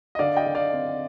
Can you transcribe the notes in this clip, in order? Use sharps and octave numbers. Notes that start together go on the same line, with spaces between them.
D#5
D3 D5 F5
D#5 G5
D3
D5 F5
C4